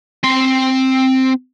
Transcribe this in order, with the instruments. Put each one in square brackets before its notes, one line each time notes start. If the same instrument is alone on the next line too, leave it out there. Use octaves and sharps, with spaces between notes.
[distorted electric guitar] C4 C6